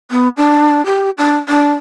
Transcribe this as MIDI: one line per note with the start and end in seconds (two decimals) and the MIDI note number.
0.11 0.28 59
0.37 0.84 62
0.86 1.10 67
1.18 1.37 62
1.49 1.71 62